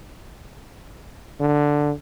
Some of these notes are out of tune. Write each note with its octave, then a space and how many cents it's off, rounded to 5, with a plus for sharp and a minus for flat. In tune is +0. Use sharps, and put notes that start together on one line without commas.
D3 +0